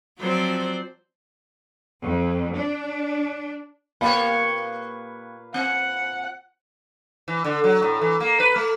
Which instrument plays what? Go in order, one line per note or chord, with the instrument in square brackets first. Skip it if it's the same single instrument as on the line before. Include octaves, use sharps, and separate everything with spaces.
[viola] F3 C4 [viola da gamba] F#3 C5 D5
[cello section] F2
D4
[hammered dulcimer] A#2 B4 [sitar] A#3 G4 C#5 [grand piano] F5 B5
[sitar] C4 [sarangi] F#5
[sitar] E3
D3
F#3
A2
E3
A#3
B4
A3